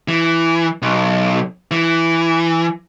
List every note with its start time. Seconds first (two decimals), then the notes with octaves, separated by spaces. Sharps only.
0.08 E3
0.82 B1
1.71 E3